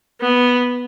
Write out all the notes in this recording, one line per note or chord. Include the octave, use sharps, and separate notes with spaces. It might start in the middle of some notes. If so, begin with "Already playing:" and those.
B3